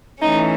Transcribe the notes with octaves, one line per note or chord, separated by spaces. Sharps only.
E3 A3 C#4 D#4